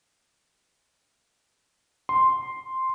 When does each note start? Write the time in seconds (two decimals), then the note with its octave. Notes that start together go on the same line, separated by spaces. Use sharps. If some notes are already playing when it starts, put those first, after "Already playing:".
2.09 C6